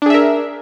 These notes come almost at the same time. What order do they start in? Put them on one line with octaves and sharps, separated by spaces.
D4 G#4 E5 A#4